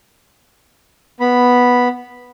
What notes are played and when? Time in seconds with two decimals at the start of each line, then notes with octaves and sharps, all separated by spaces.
1.20 B3 B5